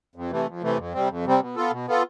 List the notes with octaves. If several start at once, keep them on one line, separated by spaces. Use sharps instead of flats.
F2
C3 E3 A3
F2
C3 E3 A3
F2
C3 G3 C4
F2
C3 G3 C4
B2
B3 F4 A4
B2
B3 F4 A4